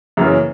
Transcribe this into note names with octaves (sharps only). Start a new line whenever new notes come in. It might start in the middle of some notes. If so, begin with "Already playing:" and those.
F#2 C#3 E3 A#3 C#4